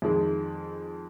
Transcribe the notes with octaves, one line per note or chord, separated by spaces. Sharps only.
F2 D#3 G#3